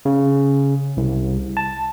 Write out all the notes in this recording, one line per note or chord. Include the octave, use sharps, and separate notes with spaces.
C#3
C2
A5